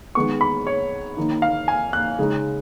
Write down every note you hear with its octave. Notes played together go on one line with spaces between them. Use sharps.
D#3 G#3 B3 C#6
B5
C#5
D#3 A#3 D#4
F5
G#5
F#6
C#3 G#3 D#4